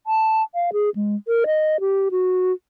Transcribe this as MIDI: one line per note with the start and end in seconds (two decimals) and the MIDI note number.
0.07 0.43 81
0.55 0.70 77
0.73 0.90 68
0.95 1.16 56
1.28 1.44 70
1.47 1.80 75
1.80 2.09 67
2.11 2.52 66